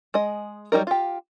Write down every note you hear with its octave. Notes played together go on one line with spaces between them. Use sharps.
G#3 D#5
F#3 G3 D#4 A#4
F4 G4